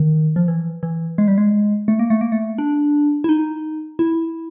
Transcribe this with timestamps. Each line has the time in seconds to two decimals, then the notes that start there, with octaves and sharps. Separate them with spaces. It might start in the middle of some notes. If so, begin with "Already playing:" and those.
Already playing: D#3
0.36 F3
0.48 E3
0.83 E3
1.18 G#3
1.28 G3
1.38 G#3
1.88 A3
1.99 A#3
2.10 A3
2.21 A#3
2.32 A3
2.58 D4
3.24 E4
3.29 D#4
3.99 E4